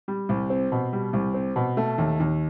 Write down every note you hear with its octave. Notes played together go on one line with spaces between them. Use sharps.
G3
C2
C4
B2
G3
C2
C4
B2
A3
D#2
D#2